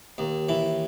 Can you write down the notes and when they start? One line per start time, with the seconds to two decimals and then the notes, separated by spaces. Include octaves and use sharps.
0.18 D#2
0.49 E3